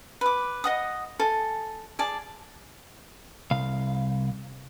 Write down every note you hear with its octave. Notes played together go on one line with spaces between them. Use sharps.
B4 D6
D#5 F#5 D#6
A4 G#5
G#4 D5 A5
C2 F5